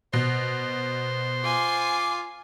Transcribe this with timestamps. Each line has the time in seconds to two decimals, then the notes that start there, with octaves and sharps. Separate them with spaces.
0.13 B2 C5
1.44 F4 G#5 C6 D6